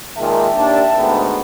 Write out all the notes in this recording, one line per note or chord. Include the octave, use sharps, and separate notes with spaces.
A#2 D#3 G#3 E5 G5 A5
D#2 D4
D2 G#2 B3